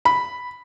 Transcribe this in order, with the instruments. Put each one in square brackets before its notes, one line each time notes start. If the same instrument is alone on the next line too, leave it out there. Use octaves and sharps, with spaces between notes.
[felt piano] B5